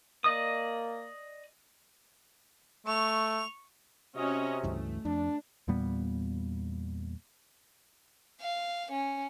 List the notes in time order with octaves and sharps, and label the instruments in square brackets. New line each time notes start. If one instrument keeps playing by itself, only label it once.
[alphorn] A#3 [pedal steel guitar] D5 D#5 D#6
[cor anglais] A3 [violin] C#6 F7
[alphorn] C3 [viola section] C#4 F#4 D#5
[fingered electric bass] C#2 G2 E3 [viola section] A3
[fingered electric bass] F2 [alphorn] D4
[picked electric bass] E2 A#2 G3 B3
[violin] F5
C#4